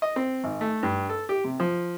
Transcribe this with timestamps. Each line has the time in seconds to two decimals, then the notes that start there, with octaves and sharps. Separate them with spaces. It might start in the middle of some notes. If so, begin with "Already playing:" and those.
0.02 D#5
0.16 C4
0.44 G#1
0.61 A3
0.83 G2
1.09 A4
1.29 G4
1.44 C3
1.60 F3